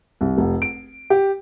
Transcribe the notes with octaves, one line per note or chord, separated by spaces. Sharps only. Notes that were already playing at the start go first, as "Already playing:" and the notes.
C2
F1
D7
G4